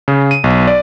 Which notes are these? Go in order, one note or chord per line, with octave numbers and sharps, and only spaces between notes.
C#3
D#7
B1
D5